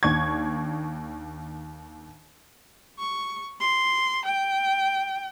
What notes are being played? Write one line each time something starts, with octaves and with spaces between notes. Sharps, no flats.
D#2 D4 C#6 G#6
C#6
C6
G5